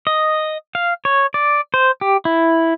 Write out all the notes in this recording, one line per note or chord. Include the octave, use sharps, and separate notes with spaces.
D#5
F5
C#5
D5
C5
G4
E4